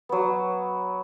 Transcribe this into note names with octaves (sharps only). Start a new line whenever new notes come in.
F#3 B3